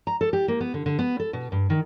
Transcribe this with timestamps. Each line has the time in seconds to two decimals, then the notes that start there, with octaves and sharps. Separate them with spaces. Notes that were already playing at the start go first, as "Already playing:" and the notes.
0.07 A#5
0.21 A4
0.33 G4
0.48 A#3
0.61 B3
0.74 D3
0.86 D3
0.99 B3
1.20 A4
1.33 B2
1.52 G2
1.70 D#3